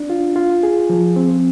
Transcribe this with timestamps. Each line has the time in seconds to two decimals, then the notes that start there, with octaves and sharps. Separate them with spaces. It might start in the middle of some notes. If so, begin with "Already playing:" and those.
Already playing: D4
0.10 F4
0.36 F4
0.63 G#4
0.90 F3
1.16 C4